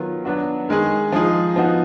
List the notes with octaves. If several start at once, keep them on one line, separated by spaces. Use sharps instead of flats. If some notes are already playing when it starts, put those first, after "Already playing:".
Already playing: D#3 F#3 B3 F4
F#3 B3 D4 F#4
D#3 G#3 D#4 G#4
F3 G#3 D#4 G#4
F3 B3 D#4 F#4